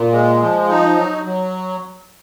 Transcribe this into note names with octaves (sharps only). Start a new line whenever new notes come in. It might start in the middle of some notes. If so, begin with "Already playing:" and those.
Already playing: A#2
G#3
F3
D#4
F#3
F#3